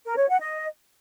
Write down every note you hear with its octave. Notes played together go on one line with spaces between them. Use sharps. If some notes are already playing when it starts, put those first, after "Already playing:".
A#4
C#5
F#5
D#5